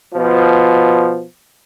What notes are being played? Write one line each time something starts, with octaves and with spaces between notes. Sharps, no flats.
B2 F3